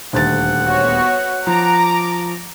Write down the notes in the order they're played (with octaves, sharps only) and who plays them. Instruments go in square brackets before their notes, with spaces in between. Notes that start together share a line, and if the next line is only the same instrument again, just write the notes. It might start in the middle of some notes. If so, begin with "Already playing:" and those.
[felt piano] D#1 D2 A6 [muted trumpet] F#5
[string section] B3 F#4 C#5
[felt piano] F3 [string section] A#5 D6